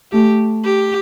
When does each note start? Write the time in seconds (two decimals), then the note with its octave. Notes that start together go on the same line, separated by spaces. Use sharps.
0.12 A3 G4
0.64 G4